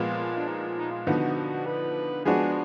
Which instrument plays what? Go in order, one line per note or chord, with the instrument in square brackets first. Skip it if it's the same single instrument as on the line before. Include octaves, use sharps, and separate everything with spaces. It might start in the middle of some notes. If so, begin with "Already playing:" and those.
Already playing: [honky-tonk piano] A#2 F3 G#3 B3 [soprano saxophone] F4
[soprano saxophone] D4
D#4
D#4
F4
[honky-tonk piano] D3 F3 B3 D#4 [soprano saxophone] F#4
[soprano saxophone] B4
[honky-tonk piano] F3 G#3 B3 D4 F#4 [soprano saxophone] G#4